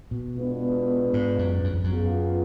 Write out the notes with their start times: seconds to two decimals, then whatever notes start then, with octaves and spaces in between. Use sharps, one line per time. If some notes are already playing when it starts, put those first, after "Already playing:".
0.11 B2
0.37 G#3 B3 D4 F4 B4
1.13 G#2
1.39 F#2
1.64 F#2
1.74 F2
1.84 F#2
1.90 B3 F4 G#4